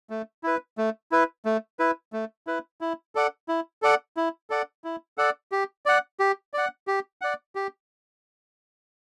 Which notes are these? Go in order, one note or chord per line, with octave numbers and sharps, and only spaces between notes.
A3
E4 B4
A3
E4 B4
A3
E4 B4
A3
E4 B4
E4
A4 D5 F#5
E4
A4 D5 F#5
E4
A4 D5 F#5
E4
A4 D5 F#5
G4
D5 F#5
G4
D5 F#5
G4
D5 F#5
G4